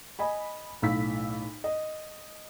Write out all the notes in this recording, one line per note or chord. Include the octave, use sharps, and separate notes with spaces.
D#5 G#5 B5
B1 A2 F5 E6 B6
D#5